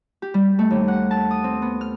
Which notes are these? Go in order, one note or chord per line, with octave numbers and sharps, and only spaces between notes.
G4
G3
A3
D#2
F#5
A5
D#6
C4
B3
F6